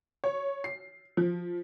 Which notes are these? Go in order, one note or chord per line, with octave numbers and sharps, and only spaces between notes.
C#5
C7
F3